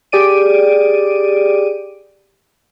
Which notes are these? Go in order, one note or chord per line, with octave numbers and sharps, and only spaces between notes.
G4 G#4 D5 D7 D#7